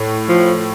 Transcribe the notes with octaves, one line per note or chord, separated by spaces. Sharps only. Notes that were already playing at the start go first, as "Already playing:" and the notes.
Already playing: A2
F3